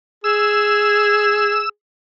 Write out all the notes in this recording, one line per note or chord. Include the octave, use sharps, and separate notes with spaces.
G#4 E6